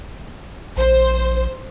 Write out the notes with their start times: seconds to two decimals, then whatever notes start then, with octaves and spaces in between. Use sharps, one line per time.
0.77 A#1 C5